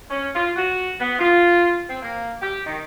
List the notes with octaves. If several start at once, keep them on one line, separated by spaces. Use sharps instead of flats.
C#4
F4
F#4
B3
F4
C4
A#3
G4
D#3